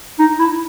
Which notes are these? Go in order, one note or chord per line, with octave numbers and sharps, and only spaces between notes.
D#4
E4